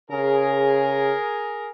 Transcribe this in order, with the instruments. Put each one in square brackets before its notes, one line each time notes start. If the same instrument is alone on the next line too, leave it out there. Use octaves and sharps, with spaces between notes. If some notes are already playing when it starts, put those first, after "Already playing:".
[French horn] C#3 [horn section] G#4 A#4